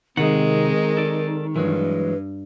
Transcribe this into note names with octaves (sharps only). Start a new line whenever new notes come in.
C3 D#3 G#3 C4 D#4 A#4 F#5
A4 D5
G2 E3 F#3 G#3 B4